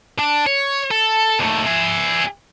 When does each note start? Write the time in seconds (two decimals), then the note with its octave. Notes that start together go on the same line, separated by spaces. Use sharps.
0.19 D4
0.47 C#5
0.91 A4
1.39 D#2 A3
1.66 G#4 E5